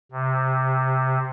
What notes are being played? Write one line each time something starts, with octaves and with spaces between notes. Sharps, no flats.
C3